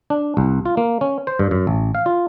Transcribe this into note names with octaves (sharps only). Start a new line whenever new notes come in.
D4
C2
F4
A#3
C#4
C5
G2
F#2
A1
F5
F4